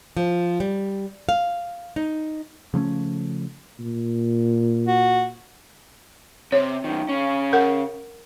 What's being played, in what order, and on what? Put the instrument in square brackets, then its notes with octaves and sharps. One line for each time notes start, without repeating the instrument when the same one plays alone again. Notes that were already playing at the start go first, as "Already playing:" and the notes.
[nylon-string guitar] F3
G3
F5
D#4
[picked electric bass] C#3 F3 A3 C#4
[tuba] A#2
[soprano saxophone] F#4
[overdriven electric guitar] C3 [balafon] C#5
[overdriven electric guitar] F#2 D#3
C#3 C#4
[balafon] A#4 F#5